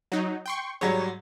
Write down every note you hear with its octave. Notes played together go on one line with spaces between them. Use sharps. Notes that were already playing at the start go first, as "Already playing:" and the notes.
F#3 D#4
G5 C6 C#6
G#2 F#3 G3 C#5